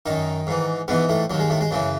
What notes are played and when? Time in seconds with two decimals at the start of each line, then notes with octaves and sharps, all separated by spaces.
0.06 F#2 D#3 D#4
0.47 G#2 E3
0.88 G#2 B2 E3 B3
1.09 A2 A3
1.30 D#2 F#3
1.33 D#3
1.40 G#3
1.50 A2 A3
1.61 G#3
1.71 F#2 C#3 E3 F#3